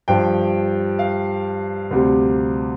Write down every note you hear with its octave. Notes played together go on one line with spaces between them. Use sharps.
G2 F3 G5
F5
D2 C3 G3